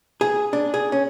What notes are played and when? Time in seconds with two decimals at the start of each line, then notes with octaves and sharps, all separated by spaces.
0.21 G#4
0.53 D4
0.74 G#4
0.92 C#4